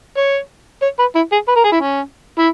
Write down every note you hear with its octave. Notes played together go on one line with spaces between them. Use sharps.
C#5
C#5
B4
E4
G#4
B4
A#4
G#4
E4
C#4
E4